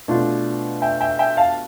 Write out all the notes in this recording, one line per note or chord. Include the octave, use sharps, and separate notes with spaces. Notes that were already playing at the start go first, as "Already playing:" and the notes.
B2 A3 D4 F4
E5 G5
E5 G5
E5 G5
F5 A5